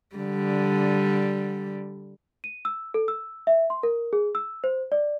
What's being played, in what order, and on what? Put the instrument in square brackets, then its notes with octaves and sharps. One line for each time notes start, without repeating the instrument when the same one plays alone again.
[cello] D3 G3
[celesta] D#7
E6
A4
E6
E5
C6
A#4
G#4
E6
C5
D5